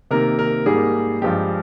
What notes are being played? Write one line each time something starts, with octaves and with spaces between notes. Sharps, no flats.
C3 D#3 A#3 A#4
A#4
G#2 G3 A#3 G#4
G2 F3 G#3 G4